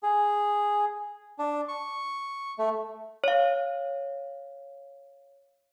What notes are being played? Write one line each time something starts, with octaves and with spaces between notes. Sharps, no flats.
G#4
D4
C#6
A3
C#5 F5